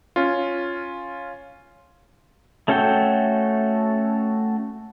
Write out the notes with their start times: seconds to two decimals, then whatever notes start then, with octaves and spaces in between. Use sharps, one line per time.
0.16 C#4 F4
2.68 A3 C#4 F#4 A4 G5